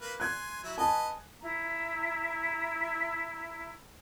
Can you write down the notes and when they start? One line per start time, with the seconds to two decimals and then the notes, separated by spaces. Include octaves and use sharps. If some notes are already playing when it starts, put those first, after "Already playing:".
0.01 A#3 B4
0.20 G#5 C6 F#6 G#6
0.63 F#3 E4
0.78 B4 D#5 G#5 A5
1.41 E4 A#5